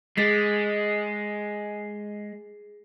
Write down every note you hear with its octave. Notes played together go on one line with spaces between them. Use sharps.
G#3 G#4 A6 B6